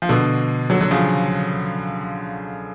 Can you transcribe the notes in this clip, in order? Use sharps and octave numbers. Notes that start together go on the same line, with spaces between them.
F3
B2 D3
D3 F#3
D3 F#3
C#3 F3